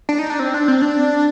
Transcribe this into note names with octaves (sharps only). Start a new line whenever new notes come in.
D4
D#4
D4
C4
D4
C4
D4